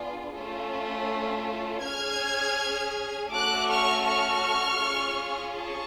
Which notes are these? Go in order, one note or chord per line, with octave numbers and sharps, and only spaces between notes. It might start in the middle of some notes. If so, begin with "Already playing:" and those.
Already playing: B3 D4 F4 G#4
A3 C#4 F4
C#4 G#4 F6 G#6
A3 C#4 F#4 A4 D6 F#6
C#6 F6
C#6 F6
C#4 F4 G#4
A5 C#6